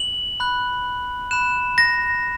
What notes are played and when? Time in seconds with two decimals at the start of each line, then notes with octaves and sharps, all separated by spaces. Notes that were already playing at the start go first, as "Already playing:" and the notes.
Already playing: F#7
0.40 B5 F#6
1.31 B5 F#6 E7
1.78 A#6